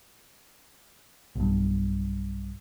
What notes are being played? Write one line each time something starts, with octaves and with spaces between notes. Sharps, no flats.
B1 G2